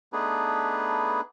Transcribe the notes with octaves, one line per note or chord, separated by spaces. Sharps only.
A3 B3 D4 D#4 G#4 B4